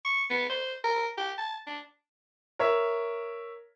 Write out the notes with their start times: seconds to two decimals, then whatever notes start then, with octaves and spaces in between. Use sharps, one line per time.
0.05 C#6
0.30 B3
0.50 C5
0.84 A#4
1.17 G4
1.38 A5
1.67 D4
2.59 A#4 C#5 E5